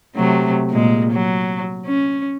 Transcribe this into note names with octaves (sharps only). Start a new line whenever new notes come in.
C3 F#3 A3
A#2 G#3
F#3
C#4